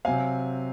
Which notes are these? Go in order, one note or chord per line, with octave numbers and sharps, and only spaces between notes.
C3 F#3 C4 F5 G#5